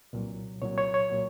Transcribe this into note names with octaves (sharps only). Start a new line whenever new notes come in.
C2 A#2 F#3
C2 A#2 F#3 C#5
C#5
C#5
A#2 F#3